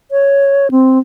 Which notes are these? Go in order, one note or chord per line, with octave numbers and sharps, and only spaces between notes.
C#5
C4